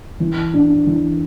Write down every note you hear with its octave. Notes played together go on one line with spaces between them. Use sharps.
E3
D4
E3